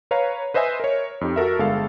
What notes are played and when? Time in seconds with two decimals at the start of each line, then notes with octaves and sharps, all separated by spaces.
0.11 B4 C#5 F5 A#5
0.54 B4 C5 D#5 E5 G#5
0.80 A#4 C#5
1.21 F2 D#4 G4
1.36 F#4 A4 A#4 E5
1.59 G1 G#3 A4 F5